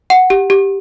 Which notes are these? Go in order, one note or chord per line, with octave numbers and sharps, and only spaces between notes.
F#5
G4
G4